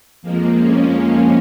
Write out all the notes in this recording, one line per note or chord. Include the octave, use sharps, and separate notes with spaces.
F2 F3 G#3 A#3
C#4